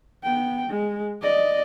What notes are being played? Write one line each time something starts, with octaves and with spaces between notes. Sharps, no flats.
B3 G5
G#3
D5 D#5